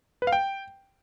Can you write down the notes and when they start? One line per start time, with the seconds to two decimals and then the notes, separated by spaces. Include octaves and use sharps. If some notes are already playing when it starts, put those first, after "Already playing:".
0.22 B4
0.27 F5
0.32 G5